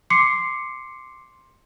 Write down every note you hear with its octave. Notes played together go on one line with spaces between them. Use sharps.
C6 D6 C7 C#7